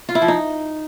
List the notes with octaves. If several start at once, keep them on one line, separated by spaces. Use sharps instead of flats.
F4
E4
F3
D#4